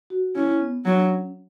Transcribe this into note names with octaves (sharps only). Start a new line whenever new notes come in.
F#4
C#4 E4
B3
F#3 D4
C#4